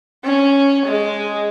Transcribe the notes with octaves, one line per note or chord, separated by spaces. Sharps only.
C#4
G#3